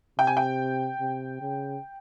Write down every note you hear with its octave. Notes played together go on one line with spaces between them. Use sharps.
C3 G5
G#5
G5
C3
C#3